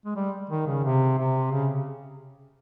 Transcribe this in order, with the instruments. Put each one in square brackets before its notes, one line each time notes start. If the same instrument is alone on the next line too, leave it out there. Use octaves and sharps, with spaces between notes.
[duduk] G#3
G3
D#3
C#3
C3
C3
C#3